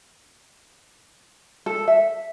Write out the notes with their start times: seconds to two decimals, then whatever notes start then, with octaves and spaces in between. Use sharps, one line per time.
1.66 A4
1.87 E5